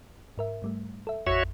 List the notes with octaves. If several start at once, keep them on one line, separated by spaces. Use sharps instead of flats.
G#2 A#4 E5
G#2 G3 A3
A4 E5
A1 F2 F#4 C#5 E5